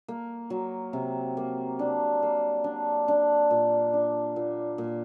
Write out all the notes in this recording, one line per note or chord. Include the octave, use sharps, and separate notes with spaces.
A#3
F#3
C3
A#3
D4
A#3
D4
D4
A#2
D4
A#2
A#2